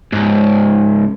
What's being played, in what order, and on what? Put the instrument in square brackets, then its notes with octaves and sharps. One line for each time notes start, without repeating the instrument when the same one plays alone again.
[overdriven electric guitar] C#2 G#2